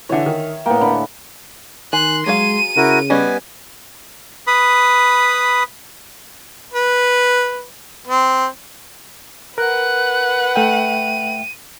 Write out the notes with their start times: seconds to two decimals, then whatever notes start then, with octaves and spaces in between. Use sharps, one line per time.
0.09 D3 E3 C#5 E5 G#5
0.26 D#3
0.66 A2 A#3 B3 G5
0.81 D3 B5
1.93 D#3 G#5 C6 F#6
2.26 F#3 G#3 G#4 F5 D#7
2.76 C#3 E4 F#4 A#4
3.10 G3 B3 C#4 B4 D#5 G#5
4.47 B4 B5 D#6
6.74 B4
8.08 C4
9.58 A#4 B4 F#5 F#6
10.56 A3 E5 G5 D#7